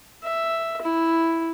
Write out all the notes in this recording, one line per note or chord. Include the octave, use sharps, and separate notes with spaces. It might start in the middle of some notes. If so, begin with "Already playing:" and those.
E5
E4